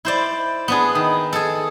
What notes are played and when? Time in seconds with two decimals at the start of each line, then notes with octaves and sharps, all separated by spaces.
0.05 E4 C5 D5
0.68 B3 D4 G#4
0.95 D#3
1.33 G#4 A4